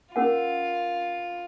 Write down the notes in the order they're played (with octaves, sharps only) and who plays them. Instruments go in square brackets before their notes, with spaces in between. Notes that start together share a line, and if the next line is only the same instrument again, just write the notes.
[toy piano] C#4 A#4 F#5 [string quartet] F4